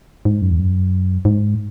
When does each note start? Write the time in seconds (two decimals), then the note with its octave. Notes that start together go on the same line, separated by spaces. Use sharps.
0.25 G#2
0.42 F#2
0.51 E2
0.59 F#2
1.25 G#2